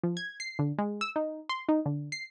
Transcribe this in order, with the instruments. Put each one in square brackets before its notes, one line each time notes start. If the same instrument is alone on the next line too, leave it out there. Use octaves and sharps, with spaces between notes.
[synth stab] F3
G#6
C7
D3
G#3
E6
D#4
C6
D#4
D3
C7